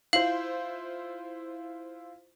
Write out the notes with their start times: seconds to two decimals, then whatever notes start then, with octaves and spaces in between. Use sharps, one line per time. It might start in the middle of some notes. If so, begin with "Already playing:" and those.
0.13 E4 F4 C5 F5 F#7